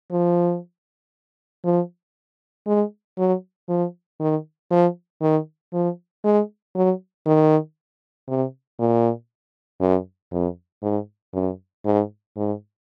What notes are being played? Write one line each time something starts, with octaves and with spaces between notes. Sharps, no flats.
F3
F3
G#3
F#3
F3
D#3
F3
D#3
F3
G#3
F#3
D#3
C3
A#2
F#2
F2
G#2
F#2
G#2
G#2